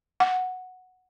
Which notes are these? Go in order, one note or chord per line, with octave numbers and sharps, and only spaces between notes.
F#5